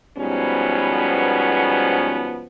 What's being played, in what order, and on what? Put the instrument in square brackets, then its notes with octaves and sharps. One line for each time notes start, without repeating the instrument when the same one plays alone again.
[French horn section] G#2 B2 F3 G3 B3 C#4